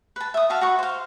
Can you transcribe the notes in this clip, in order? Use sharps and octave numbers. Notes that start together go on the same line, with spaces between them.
B4 A5
E5 D#6
F#4 E5 F5 A5
F#4 B4 C#6
C5 F5